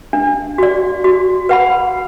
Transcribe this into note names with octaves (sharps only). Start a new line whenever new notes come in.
D4
F#4 D5
F#4
B4 F#5 B5